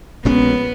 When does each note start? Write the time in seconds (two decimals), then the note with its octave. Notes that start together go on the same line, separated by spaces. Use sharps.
0.25 A#1 A#2 G#3 B3 C#4